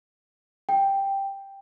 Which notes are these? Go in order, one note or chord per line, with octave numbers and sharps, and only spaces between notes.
G5